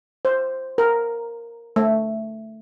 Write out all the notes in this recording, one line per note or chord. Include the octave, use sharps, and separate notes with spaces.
C5
A#4
A3